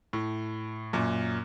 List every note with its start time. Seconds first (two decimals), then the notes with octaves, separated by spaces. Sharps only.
0.13 A2
0.93 F#2 A#2